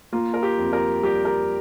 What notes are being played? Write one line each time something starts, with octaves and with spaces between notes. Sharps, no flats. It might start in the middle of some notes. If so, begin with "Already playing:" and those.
A#3 F4
A#4
G4
F2
A#4
G3 G4
A#4